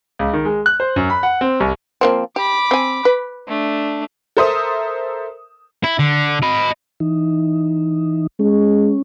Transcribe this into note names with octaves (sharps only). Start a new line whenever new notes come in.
C#2
D#3
G#3
F#6
C5
F#2
B5
F#5
C4
C2
F3 A#3 C4
G4 B5 D6
C4 G#5
B4
A3 D4
A4 A#4 C5 E5 D#6
E4
D3
D#5 B5
E3 D#4
G#3 C#4